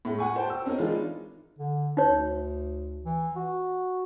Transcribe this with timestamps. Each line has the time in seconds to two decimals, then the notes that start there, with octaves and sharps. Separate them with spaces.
0.05 A2 G#3
0.19 F#5 G#5 C#6
0.36 C5 G5 A5
0.50 E6
0.66 C4 C#4 D#4 A#4
0.78 E3 G#3 D4 D#4 F4
1.59 D3
1.97 D2 D#4 C#5
3.05 E3
3.36 F#4